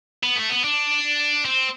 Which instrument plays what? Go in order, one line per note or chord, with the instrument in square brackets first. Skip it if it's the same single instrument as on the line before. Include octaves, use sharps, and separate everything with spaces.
[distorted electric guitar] B3
A3
B3
D4
C4